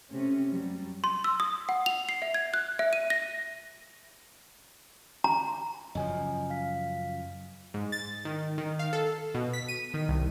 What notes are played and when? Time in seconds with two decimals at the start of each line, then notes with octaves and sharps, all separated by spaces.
0.11 C3 A3 C#4
0.49 F#2 F#3 G3
1.04 C6
1.24 E6
1.40 D#6
1.69 F#5
1.86 F7
2.09 C7
2.22 E5
2.34 G#6
2.54 F#6
2.79 E5
2.93 D#7
3.10 A#6
5.24 A#5
5.95 F#2 C#3 F3 D#5 G#5
6.50 F5 B6
7.74 G#2
7.92 A6
8.25 D#3
8.58 D#3
8.79 F5
8.93 A4
9.34 B2
9.53 B6
9.68 D#7
9.94 D#3
10.08 C2